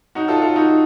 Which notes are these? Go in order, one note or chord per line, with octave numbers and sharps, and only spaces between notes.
D#4 F#4
F4 A4
F4 A4
D#4 F#4